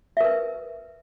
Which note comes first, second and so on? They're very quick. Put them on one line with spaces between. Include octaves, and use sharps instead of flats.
E5 A#4 B4